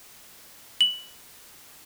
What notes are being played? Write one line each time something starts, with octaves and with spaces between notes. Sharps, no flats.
F#7